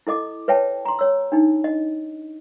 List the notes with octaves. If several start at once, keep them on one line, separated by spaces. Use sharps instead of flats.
E4 A4 D#5 D6
B4 C#5 E5 G5 A5
A#5 C6
C#5 E6
D4 D#4
D#5